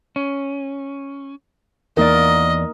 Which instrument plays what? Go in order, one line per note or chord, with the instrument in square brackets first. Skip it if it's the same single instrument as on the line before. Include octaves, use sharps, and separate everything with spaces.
[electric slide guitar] C#4
[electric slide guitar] E2 D5 [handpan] A#3 D#4 A#4 [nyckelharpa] D#5